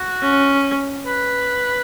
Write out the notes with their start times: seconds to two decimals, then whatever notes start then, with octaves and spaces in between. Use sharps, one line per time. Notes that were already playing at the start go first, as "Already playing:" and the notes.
Already playing: F#4
0.22 C#4
1.07 B4